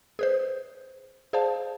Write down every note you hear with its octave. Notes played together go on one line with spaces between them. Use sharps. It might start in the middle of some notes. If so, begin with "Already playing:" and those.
G#4 B4 C5
G#4 C5 D5 F5 A5